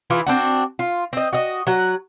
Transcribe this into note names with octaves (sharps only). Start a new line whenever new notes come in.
E3 E4 F4 G#4
C4 D4 F#4
F4
C4 D#5
F#4 D#5
F#3 F#5